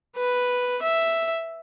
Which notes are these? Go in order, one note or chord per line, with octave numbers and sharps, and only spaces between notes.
B4
E5